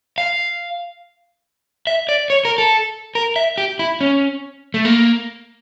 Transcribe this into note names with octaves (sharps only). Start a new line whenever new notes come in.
F5
E5
D5
C#5
A#4
A4
A#4
E5
G4
E4
C#4
A3
A#3